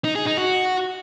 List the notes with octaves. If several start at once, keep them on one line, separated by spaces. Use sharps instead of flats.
D#4
G#4
D#4
F#4